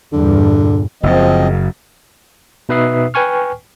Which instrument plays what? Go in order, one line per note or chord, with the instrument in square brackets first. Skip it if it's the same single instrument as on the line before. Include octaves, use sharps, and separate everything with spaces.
[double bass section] E2 G2 A#2 [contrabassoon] D3
[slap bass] F#1 F#2 [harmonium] F3 C4 D#5
[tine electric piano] B2 D#4 B4 E5 D#6 C7
B4 G5 G#5 C#6 F6